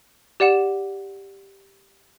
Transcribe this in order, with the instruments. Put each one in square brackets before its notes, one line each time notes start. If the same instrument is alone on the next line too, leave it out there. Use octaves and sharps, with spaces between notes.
[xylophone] G4 D5 F#5 E7